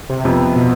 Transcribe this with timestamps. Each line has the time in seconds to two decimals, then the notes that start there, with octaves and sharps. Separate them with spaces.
0.10 C3
0.25 F2 C3 F3 B3
0.56 B2